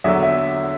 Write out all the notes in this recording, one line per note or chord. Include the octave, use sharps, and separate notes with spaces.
E2 D3 F#3 E5
E5